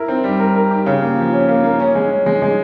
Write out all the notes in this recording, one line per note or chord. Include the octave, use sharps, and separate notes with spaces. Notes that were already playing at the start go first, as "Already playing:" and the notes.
Already playing: E4 A#4
C4
G3
A#4
A#4
G4
C#3
A#3
F3
C#4
A#3
A#3
C#4
G#3
C#4
G#3
G#3